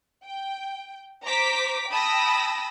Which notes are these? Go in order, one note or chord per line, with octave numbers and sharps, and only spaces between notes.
G5
C5 A#5 D6 B6
G5 A5 B5 D#6 E6 A#6